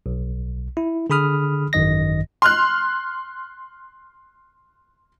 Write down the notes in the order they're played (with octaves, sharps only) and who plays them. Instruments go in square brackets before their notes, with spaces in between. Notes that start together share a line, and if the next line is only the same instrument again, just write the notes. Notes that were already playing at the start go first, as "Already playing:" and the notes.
[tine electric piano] B1
E4
D3 G#4 B5 D#6 F6
G#1 F#2 D#3 D#5 A#6
[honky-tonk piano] C6 F6 F#6